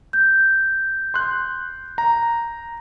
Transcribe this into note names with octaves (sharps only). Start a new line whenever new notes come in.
G6
C6 F#6
A#5